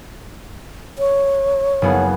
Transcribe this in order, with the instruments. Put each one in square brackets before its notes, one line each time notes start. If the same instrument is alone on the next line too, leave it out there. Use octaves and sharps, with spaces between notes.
[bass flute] C#5
[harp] F#1 B3 G#4